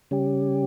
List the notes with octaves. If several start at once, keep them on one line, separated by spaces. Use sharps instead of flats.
C#3 G3 C#4 G4